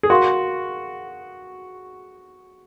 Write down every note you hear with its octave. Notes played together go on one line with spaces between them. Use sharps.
G#4
F#4 A#4 F5 C6